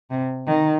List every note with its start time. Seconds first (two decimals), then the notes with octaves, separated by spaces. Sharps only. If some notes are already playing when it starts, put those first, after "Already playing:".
0.10 C3
0.47 D#3